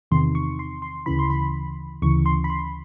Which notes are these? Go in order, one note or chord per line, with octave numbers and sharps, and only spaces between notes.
E2 C3 D#3 C6
C#6
C6
C6
D2 C#3 E3 B5
C6
B5
D2 C#3 E3 C#6
C6
B5
C6